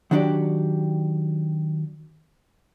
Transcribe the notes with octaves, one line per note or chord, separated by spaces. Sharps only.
D#3 F#3 D4 F#4 G4 D5